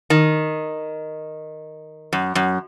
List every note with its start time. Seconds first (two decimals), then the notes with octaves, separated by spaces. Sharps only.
0.10 D#3
2.13 F#2
2.35 F#2